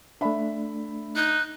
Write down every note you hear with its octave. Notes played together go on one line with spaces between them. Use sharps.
A3 D4 E5 B5
D#4 F#6